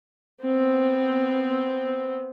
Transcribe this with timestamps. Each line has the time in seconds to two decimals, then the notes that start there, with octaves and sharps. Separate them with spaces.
0.42 B3 C4